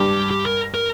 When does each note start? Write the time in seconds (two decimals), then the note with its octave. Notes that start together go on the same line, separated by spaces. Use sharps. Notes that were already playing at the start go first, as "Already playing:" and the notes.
Already playing: G2 G4
0.31 G4
0.46 A#4
0.74 A#4